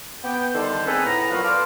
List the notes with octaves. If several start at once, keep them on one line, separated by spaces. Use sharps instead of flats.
B3 G5
D3 D#3 G3 A4 C5
B3 C4 D#4 G#4 A4 B4
A2 B3 A#5
A#2 F3 F#3 B3 F5 A#5
A4 B4 C5 D5 F5